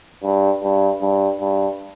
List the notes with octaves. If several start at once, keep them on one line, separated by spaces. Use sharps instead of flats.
G2
G2
G2
G2